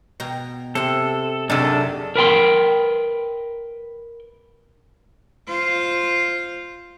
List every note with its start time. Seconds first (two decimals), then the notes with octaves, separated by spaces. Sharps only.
0.20 B2 G5 A#5
0.75 C3 A4 C6
1.50 F#2 C3 D4 D#4 G#4 A4 D5
2.16 A#4 B4 G5 C6
5.48 F4 C5